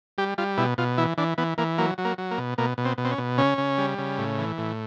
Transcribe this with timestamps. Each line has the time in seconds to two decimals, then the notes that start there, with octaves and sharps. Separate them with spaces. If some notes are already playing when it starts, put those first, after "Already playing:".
0.18 G3 G4
0.38 G3 F4
0.58 B2 E4
0.78 B2 F4
0.98 E3 E4
1.18 E3 D4
1.38 E3 B3
1.58 E3 A#3
1.78 F#3 A#3
1.98 F#3
2.05 A#3
2.18 F#3
2.31 A#3
2.38 B2
2.58 B2 A#3
2.78 B2
2.85 C4
2.98 B2
3.05 C4
3.11 C#4
3.18 B2
3.38 C#3 C#4
3.58 C#3
3.78 G3
3.98 C#3
4.18 A2
4.38 E3
4.58 A2